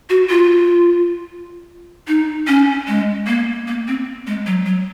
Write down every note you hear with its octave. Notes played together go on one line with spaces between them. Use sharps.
F#4
F4
D#4
C#4
G#3
A#3
A#3
C4
G#3
F#3
F#3